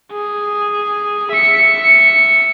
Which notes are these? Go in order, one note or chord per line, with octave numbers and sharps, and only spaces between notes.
G#4
E5 C#7